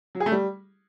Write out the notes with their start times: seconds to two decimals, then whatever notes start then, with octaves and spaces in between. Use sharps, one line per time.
0.15 F#3
0.20 G#4
0.26 A3
0.32 G3